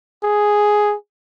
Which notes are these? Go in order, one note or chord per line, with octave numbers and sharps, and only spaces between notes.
G#4